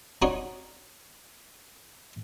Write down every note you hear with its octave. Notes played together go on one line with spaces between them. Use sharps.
C4 D4 D#4 F#4 C5 C#5